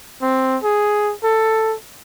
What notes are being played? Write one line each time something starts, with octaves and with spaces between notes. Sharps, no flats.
C4
G#4
A4